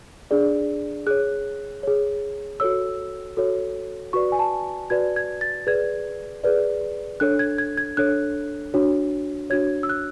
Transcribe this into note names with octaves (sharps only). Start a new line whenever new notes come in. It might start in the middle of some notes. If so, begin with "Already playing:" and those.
D4 G#4 D5
G#4 C#5 F#6
G#4 C#5
F#4 A4 C#5 E6
F#4 A4 C#5
F#4 B4 D5 C#6
G#5
A5
F#4 B4 D5 G#6
G#6
A6
G#4 B4 D5 G#6
G#4 B4 D5
D4 A4 C#5 F#6
G#6
G#6
G#6
D4 A4 C#5 F#6
D4 F#4 C#5
D4 F#4 C#5 G#6
E6
F#6